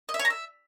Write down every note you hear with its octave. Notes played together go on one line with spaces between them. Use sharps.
D#5
E5
C#5
A#5
E5